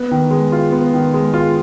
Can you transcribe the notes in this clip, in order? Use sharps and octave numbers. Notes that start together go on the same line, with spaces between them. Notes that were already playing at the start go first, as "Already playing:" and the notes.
Already playing: B3
D#3
G#3
F4
B3
D#3
G#3
F4